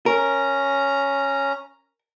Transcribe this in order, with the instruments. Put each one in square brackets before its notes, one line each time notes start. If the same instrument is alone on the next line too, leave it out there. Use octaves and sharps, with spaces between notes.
[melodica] C#4 A#5 [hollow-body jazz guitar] A#4